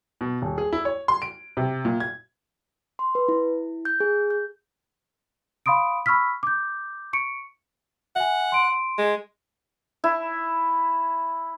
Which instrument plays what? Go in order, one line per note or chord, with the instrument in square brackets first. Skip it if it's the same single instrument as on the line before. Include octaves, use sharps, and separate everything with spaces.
[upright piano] B2
D#1
G#4
E4
C#5
C6
D7
C3
A#2
G#6
[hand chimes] C6
B4
E4
G6
G#4
G6
[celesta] F5 B5 C6 D#6 D7
B5 C#6 E6 F6 B6
D6 G6
C#6 C#7 D7
[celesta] E5 G#5 [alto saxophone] F#5
[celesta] C6 D7
[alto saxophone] G#3
[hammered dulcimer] E4